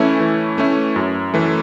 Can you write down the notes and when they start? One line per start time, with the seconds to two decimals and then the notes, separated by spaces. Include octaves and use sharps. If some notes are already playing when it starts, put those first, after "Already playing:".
Already playing: E3 A3 C#4 E4
0.20 E3
0.58 A3 C#4 E4
0.96 F#2
1.34 E3 A3